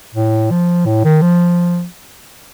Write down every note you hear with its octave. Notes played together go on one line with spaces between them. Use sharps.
A2
F3
A2
D#3
F3